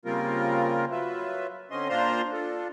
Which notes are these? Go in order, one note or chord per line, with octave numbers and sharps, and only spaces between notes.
C#3 G3 A#3 C4 F4 A#4
F#3 F4 B4 E5
D3 C4 C#4 D#5 C6
A#2 D4 F4 C5 A#5 C6
D4 F4 A4